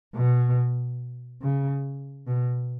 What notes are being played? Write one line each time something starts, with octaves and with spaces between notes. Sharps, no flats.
B2
C#3
B2